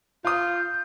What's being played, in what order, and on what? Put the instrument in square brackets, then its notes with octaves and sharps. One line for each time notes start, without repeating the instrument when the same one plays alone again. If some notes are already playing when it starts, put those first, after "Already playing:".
[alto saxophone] F4 [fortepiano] F5 D#6 [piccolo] G6